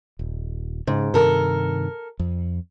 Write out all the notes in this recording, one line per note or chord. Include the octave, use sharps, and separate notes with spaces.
D#1
G#2 C#3
G2 C3 D#3 A4 A#4
F2